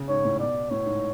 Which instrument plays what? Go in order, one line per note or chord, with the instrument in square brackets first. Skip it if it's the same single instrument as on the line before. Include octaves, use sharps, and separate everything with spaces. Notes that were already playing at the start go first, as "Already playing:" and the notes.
Already playing: [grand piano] C#3
[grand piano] G#2 [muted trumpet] C#5
[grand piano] A2
[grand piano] B2 [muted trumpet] D5
[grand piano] A2 [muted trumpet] C#5
[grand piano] G#2